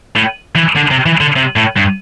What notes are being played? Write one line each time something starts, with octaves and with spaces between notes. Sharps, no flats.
A2
E3
D3
C3
E3
D3
C3
A2
G2